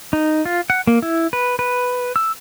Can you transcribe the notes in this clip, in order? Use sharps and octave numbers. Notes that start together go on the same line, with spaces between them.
D#4
F4
F#5
A#3
E4
B4
B4
E6